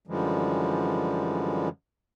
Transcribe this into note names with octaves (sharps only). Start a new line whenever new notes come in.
F#2 D3 E3 F3 G3 G#3